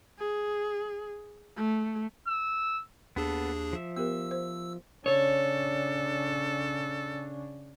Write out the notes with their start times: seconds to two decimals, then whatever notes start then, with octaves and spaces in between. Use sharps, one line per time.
0.19 G#4
1.56 A3
2.28 E6
3.16 D#2 B3 D4 G#4 A4
3.73 F3 E5
3.97 B3 G4 A#4 E6
4.31 C5
5.06 C#3 D4 A4 C#5